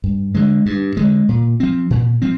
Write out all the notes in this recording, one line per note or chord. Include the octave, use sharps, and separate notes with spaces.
G2
D3 G#3
G2
D3 G#3
A#2
F3 C4
A#2
F3 C4